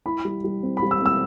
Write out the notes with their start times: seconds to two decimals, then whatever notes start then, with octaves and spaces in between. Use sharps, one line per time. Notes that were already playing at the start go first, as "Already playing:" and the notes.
0.06 E4 B5
0.25 G3
0.44 G3
0.63 C4
0.77 B5
0.82 G3
0.91 E6
1.02 C4 E6